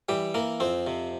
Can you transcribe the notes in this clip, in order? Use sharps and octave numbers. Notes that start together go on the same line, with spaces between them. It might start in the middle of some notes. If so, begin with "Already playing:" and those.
E3 G3 G4
E3 A#3 A#4
F2 C4 C5
C3